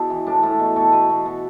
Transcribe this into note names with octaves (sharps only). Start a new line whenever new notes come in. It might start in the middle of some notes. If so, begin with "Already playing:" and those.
Already playing: B2 D4 E4 G#4
E3
A2 D4
A2 E4
B2
B2 A4
B2 B4
B2
B2